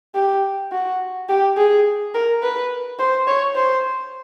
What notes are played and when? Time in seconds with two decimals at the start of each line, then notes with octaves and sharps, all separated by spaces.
0.15 G4
0.72 F#4
1.29 G4
1.57 G#4
2.14 A#4
2.43 B4
2.99 C5
3.27 C#5
3.55 C5